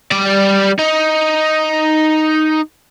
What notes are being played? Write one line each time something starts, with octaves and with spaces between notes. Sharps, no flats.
G3 D5
D#4